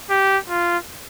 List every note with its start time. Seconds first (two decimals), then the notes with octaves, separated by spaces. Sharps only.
0.10 G4
0.50 F4